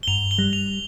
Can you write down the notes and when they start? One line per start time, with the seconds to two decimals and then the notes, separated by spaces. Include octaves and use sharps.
0.03 G7
0.08 G2 F7
0.31 G7
0.38 G3
0.53 F7